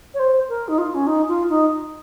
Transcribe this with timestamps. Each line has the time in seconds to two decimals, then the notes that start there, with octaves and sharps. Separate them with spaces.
0.14 C#5
0.19 C5
0.49 A#4
0.68 D#4
0.78 F4
0.94 C#4
1.07 D#4
1.28 F4
1.49 D#4